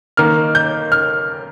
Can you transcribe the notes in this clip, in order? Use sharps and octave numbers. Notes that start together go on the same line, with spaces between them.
D#3 A#3 D#4 F6
G6
F6